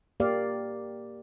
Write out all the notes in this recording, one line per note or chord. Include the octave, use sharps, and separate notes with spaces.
A#3 G4 D5 F5